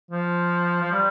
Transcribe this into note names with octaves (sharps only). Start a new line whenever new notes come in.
F3
F3
G3